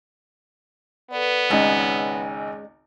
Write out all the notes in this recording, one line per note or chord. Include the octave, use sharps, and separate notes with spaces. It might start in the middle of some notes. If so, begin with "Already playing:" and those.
B3 A4 B4 D5
G#1 C#2 G#3 C#4 D#4 D5 G#5